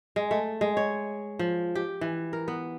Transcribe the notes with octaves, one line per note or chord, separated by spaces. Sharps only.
G#3
A3
G#3
C#5
F3
G4
E3
A#4
B3